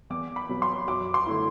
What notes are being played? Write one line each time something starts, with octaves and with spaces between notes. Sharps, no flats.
E2 D6
B5
B2 F#3
C6
F#2 D6
C6
D3 A3 E4